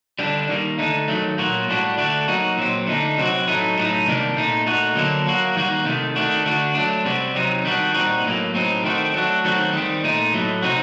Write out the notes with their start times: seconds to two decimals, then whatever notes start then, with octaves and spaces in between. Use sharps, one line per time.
0.19 D3 G3 D4
0.49 D#3 G3 A#3
0.79 D3 A3 D#4
1.08 D#3 F#3 A3
1.38 A#2 F#3 A#3 F#4
1.68 A2 G3 D4 F#4
1.98 D3 A3 D4 F#4
2.28 F#3 A#3 D#4 F#4
2.57 A#2 F#3 C4
2.87 D3 A3 D#4
3.18 C3 F#3 C4 F#4
3.47 A2 F#3 A3 D#4
3.77 A2 F#3 A3 C4 D#4
4.07 C3 D#3 G3 A#3 D4
4.36 A#2 A3 D#4
4.66 A#2 A3 D#4 F#4
4.96 D3 F#3 A#3 D4
5.26 F#3 A#3 F#4
5.56 D#3 G3 A#3 F#4
5.85 C3 D#3 A3
6.16 D#3 A3 D4 F#4
6.46 D3 A3 D4 F#4
6.75 F#3 A3 D4
7.05 C3 G3 C4 F#4
7.35 C3 F#3 C4 D#4
7.64 D#3 G3 D4 F#4
7.94 A#2 G3 C4 D#4 F#4
8.25 A2 F#3 A#3
8.54 A2 F#3 C4 D#4
8.84 D#3 A3 C4 F#4
9.14 F#3 A3 D4 F#4
9.44 D#3 F#3 A3 C4 F#4
9.73 D#3 G3 C4
10.04 A#2 A3 D#4
10.34 A2 F#3 A3
10.62 C3 F#3 C4 D#4 F#4